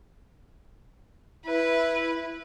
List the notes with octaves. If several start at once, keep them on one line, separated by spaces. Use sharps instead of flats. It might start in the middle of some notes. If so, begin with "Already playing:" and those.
E4 B4